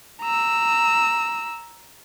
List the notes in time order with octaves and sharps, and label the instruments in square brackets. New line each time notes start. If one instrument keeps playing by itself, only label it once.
[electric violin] A#5 E6